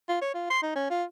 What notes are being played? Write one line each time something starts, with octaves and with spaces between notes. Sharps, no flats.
F4
C#5
F4
C6
D#4
C#4
F4